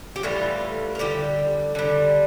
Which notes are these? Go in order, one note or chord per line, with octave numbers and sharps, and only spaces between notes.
G4
A2 E3 G3 F4
F4
D3 G3 G4
D3 G3